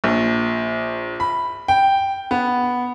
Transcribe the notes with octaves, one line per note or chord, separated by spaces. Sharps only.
A#1
B5
G5
B3